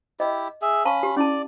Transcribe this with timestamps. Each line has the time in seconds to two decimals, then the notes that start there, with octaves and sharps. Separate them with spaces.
0.20 E4 G4 D#5
0.62 G#4 E5
0.85 C#4 F5 A5 B5 C#6
1.03 G4
1.17 C#4 E4 D5 A5